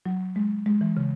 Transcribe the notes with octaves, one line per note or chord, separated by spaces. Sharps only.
F#3
G#3
G#3
E3
C#3